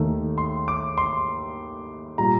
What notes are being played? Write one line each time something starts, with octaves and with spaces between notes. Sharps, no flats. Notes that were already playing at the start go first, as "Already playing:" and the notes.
Already playing: D#2 D#3 A3
C6
D6
C6
A#2 G3 A#5